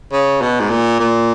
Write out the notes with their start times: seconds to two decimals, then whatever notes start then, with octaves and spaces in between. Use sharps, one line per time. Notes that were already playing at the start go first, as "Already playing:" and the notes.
0.13 C#3
0.42 B2
0.60 G#2
0.70 A#2
1.00 A#2